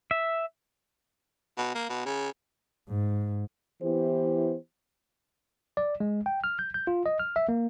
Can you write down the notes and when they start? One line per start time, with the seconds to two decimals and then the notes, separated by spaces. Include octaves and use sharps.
0.11 E5
1.57 B2
1.75 A#3
1.89 B2
2.06 C#3
2.89 G#2
3.83 E3 B3 E4 G4 C5
5.77 D5
6.00 G#3
6.26 G5
6.44 F6
6.59 G6
6.74 G6
6.87 F4
7.06 D#5
7.19 F6
7.36 E5
7.49 A#3